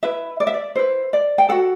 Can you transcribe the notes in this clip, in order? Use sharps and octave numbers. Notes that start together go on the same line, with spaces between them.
E4 B4 E5
D5
E5
D5
E4 B4 C5
D5
G5
F#4 A4 F#5